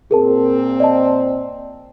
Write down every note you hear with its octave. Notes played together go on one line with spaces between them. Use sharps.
A#2 C4 G#4 A#4 A5
D5 D#5 A5